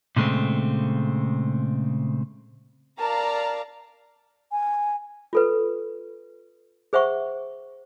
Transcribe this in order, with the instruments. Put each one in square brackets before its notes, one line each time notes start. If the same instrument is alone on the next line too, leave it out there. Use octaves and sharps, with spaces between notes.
[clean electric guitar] A#2 C#3 G#3 A3 C4
[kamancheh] A#4 A5 [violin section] D5 F5 A#5
[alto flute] G#5
[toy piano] F4 A4 B4
G#4 C5 E5 F#5 C#6